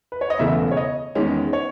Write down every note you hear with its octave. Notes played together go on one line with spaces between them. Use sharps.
B4
C#5
D#5
E1 E2 C#3 E3 A3 E5
C#5
D#5
E2 D#3 G#3 C#4
C#5